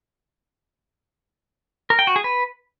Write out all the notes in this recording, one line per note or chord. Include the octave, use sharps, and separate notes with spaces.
A#4
G5
F#4
G#4
B4